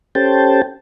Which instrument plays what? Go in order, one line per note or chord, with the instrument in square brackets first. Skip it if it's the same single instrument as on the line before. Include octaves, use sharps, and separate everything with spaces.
[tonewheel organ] C#4 G4 A4 C5 G5 A5